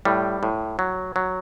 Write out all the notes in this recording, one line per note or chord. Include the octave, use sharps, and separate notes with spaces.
A2 G3
A2
F#3
F#3